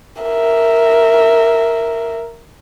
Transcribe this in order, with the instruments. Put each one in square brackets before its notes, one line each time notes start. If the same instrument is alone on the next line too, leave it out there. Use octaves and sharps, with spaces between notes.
[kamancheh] A#4 E5